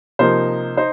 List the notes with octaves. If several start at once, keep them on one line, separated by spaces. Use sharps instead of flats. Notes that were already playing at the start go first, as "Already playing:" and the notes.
C3 F3 A#3 D#4 C5
D#4 C5